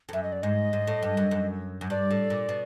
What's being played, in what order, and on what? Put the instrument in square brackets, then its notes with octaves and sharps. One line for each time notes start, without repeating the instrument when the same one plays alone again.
[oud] F2
[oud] F#2 [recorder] E5
[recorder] D#5
D5
[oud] G#2 [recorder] D#5
[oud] G#2
A2
G2
F#2
F#2
F#2
[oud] G2 [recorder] D5
[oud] A2
A#2
B2